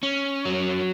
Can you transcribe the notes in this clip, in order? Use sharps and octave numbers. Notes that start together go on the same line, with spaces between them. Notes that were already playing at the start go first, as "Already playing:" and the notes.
C#4
F#3